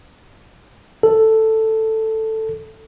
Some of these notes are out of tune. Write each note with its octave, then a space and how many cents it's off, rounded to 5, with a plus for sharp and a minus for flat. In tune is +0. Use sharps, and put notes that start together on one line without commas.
A4 +5